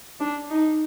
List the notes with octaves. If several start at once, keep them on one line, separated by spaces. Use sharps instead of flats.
D4
D#4